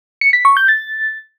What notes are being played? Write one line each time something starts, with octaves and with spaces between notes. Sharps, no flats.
C#7
B6
C#6
G6
A6